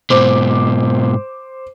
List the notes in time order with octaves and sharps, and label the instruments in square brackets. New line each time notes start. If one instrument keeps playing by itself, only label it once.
[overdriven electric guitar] G#2 B2 [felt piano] C5 D6